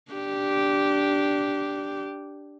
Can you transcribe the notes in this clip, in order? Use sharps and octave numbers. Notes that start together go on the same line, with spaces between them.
D4 G4